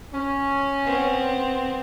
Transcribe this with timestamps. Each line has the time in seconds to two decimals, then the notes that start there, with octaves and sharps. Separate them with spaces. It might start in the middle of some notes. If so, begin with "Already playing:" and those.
0.14 C#4
0.85 B3 C4